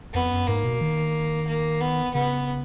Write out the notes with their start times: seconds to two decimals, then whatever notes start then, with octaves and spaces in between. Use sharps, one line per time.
0.14 F2 B3
0.30 F#2
0.47 G#2 A#3
0.64 B2
0.81 D#3
1.47 A#3
1.81 B3
2.14 C#3 B3